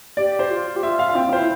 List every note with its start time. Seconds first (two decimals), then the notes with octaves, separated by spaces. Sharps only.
0.17 G4 D5
0.39 C5
0.51 F4
0.76 G4
0.83 F4 E5
0.99 F5
1.09 F5
1.15 C4 G5
1.30 F4 C5
1.39 E4